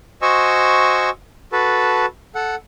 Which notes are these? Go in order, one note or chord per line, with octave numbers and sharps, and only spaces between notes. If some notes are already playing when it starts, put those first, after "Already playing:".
F#4 C5 D#5 G#5 C#6 E6
F#4 A4 B4 A5
A4 F#5